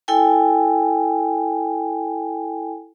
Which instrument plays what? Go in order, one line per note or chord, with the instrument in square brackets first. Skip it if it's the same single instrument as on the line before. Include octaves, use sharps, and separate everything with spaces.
[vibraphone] E4 A4 G5 G#5